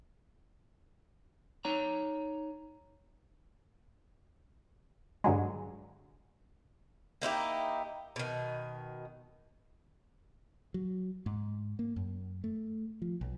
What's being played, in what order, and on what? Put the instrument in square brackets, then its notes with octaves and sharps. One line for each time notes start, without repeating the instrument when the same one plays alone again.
[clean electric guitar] D#4 C#5 A#5
[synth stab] G2 D3 F#3 G#3
[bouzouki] A#3 D#4 E4 G4
B2 D#3
[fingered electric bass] F#3
G#2
A#3
F#2
A3
F3
B1